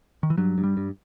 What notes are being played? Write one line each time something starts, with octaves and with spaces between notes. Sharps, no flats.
D#3
E3
G2 F#3
G2
G3
G2